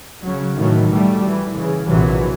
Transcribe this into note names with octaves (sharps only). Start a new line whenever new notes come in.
C#3 F#3
A2 D#3 E3 F#3 A3
B2 G3 A3
E3
C#3 E3
A#1 C3 E3 F#3